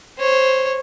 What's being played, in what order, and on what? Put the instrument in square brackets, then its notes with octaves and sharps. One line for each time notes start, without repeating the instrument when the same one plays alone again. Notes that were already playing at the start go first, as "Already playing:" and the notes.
[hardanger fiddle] C5 C#5